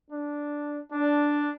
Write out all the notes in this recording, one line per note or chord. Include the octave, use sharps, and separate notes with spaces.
D4
D4